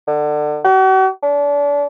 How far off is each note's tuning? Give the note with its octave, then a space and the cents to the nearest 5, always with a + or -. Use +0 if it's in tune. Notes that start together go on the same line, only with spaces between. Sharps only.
D3 +30
F#4 +45
D4 -35